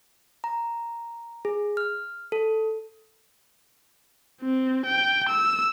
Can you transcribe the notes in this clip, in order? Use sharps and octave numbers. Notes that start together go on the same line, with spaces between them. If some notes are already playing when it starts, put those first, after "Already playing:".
A#5
G#4
F6
A4
C4
G5
E6